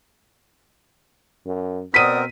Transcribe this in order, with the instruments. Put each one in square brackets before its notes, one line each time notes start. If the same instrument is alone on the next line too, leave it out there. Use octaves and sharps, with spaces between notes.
[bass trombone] F#2
[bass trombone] B2 [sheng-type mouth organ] C4 A#4 [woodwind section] D5 F#5 D#6 [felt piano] B6 D#7